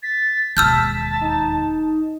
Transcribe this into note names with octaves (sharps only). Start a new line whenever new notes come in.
A6 B6
E1 D#2 A5 E6 F6 G6
D#4